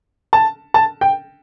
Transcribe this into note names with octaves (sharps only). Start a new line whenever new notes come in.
A5
A5
G5